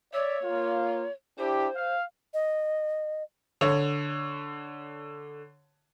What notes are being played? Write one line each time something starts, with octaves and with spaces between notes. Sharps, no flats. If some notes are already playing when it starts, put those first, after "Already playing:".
C#5 D5 E5
A#3 F4
D4 E4 G4 C5
F5
D#5
D3 C#5